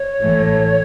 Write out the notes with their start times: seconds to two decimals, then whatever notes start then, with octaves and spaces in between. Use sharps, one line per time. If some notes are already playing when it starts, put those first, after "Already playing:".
Already playing: C#5
0.22 A1 A2 E3 A3